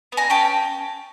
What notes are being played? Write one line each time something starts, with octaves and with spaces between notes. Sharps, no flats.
B3
G#5 A#5
C#4 G5 A5